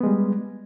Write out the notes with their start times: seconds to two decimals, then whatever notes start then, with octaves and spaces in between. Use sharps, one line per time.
0.01 B3
0.03 G#3
0.06 G3